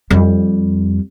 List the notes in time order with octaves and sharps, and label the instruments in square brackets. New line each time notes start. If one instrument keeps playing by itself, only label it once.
[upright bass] F2 G3